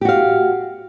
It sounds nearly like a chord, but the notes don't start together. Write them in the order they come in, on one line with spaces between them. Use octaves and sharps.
G4 F#4 F5